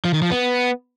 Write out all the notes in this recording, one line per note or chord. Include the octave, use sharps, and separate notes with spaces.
F3
D#3
F3
B3